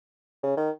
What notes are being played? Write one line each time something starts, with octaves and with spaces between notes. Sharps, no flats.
C#3
D#3